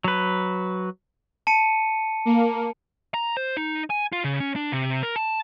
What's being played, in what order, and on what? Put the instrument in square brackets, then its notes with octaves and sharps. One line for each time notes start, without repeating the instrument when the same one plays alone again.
[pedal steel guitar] F#3 B4
[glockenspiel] A5 C#7 D#7
[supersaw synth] A#3
[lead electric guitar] A#5
C5
D#4
G#5
F4
C#3
C#4
D4
C3
A#4
A5